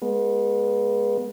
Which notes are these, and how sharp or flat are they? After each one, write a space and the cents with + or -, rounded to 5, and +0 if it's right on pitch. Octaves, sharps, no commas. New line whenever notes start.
G#3 +0 B3 -30